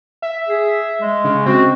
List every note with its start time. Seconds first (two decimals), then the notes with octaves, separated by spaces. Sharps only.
0.22 E5
0.48 G#4
1.02 G#3
1.24 C#3
1.46 C4 F#4